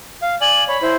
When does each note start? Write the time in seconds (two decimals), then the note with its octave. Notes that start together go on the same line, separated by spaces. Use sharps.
0.22 F5
0.41 D5 G#5 F#7
0.68 C#5 B5
0.82 E4 C5